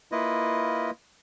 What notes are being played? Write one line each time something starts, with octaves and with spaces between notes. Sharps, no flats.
A#3 E4 F4 B4 D#5